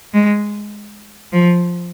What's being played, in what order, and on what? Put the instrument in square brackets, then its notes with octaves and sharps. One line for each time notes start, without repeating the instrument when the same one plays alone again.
[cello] G#3
F3